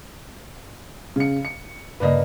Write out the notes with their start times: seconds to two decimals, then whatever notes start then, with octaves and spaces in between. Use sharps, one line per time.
1.16 C#3 C#7
1.45 C#7
2.00 G2 C#3 A#3 B4 D5 D#5